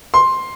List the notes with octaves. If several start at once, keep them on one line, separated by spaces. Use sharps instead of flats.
C6